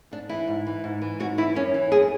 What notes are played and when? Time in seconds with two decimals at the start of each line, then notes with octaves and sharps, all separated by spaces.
0.11 G#2 D4
0.29 E3 E4
0.48 G#2
0.67 E3
0.84 G#2
1.02 E3
1.20 G#2 F#4
1.38 E3 E4
1.55 F#2 C#4
1.74 E3
1.92 F#2 G#4